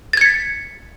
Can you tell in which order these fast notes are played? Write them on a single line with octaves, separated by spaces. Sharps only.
A6 G#6 C#7 B6